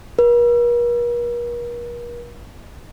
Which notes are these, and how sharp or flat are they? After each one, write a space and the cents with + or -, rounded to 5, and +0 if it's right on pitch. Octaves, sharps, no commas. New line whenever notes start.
A#4 +45